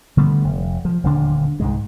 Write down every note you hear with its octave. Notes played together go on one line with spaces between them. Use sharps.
D3 G3 A3 B3
F1
F3
D#1 D2 D3 D4
C2 G#2 G#3